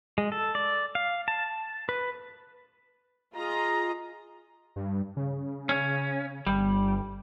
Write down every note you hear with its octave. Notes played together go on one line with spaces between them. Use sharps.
G#3
A4
D5
F5
A5
B4
F4 G#4 D#5 A#5
G2
C#3
C#4
G1 G3